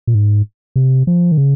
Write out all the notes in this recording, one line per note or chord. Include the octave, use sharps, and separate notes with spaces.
A#2
G#2
C3
F3
D#3
C#3